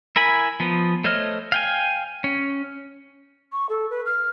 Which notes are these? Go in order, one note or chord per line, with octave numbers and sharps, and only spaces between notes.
E4 A#4 G#5 B5
F3 B3
A3 C5 C#5 D#5 F6
F5 G5 G#5
C#4
C#6
A4
B4
F6